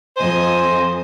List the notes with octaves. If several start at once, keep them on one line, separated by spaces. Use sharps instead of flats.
F2 C5 D#5 G#5